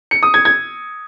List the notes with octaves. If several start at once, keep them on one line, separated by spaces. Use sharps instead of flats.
C#7
D#6
G#6
G#6